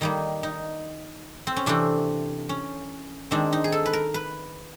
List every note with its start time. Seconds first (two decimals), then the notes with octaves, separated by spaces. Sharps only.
0.01 D#3 G3 A#3 D#4
0.43 D#4
1.47 C4
1.56 C#4
1.66 C3 E3 A3 C4 D4
2.49 C#4
3.31 D#3 G#3 C4 D4
3.53 D#4
3.64 G#4
3.72 A4
3.86 B4
3.93 A#4
4.14 B4